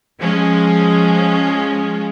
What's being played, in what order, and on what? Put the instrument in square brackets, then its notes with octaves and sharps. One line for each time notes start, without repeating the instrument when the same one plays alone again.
[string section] F3 G#3 C#4